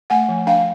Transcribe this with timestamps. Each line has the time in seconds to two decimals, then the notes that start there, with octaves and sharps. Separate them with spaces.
0.10 A3 F#5 G#5
0.29 F3
0.47 D4 F5 G5